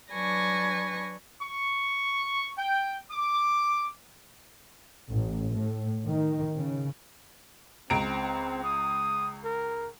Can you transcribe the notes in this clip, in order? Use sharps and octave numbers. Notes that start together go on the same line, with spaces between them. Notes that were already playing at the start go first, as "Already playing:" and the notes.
F#3 D4 B4 G#5 C#6 A#6
C#6
G5
D6
A1
A2
D#3
C#3
C#2 C4 A#5 D7
D#6
A#4